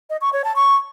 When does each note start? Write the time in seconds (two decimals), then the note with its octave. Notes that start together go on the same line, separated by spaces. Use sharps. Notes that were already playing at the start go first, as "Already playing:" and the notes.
0.10 D#5
0.21 C#6
0.33 C#5
0.44 A5
0.56 C#6